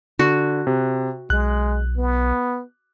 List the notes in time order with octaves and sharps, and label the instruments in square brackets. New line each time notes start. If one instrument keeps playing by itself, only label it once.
[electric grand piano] D3 [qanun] F#4
[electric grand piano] C3
[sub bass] B1 [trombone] G#3 [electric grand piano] F#6
[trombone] B3